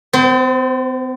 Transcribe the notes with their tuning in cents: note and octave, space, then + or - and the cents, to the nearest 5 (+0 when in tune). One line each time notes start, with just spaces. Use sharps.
C4 -45 C5 +0